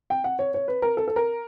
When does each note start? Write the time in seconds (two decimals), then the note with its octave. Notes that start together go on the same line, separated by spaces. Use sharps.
0.10 G5
0.24 F#5
0.39 C#5
0.54 C#5
0.68 B4
0.82 A#4
0.97 A4
1.08 A4
1.16 A#4